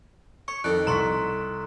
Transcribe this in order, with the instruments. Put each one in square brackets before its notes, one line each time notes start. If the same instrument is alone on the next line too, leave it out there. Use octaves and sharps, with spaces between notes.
[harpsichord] C#5 [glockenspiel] C#6
[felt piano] F2 D#3 [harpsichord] D#4 A4 D5 [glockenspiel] F#6
[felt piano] C2 C#6 B6 [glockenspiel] A#5 C6